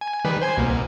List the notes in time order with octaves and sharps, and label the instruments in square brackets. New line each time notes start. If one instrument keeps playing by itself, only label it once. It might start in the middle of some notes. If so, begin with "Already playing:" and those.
[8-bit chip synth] G#5
D#3 G3 B4
C5 G#5 G#6
C2 B2 A#3